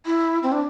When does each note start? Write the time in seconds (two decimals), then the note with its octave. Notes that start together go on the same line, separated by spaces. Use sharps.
0.06 E4
0.43 C4
0.52 D4